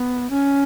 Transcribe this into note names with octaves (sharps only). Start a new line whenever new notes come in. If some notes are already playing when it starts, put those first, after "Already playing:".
Already playing: B3
C#4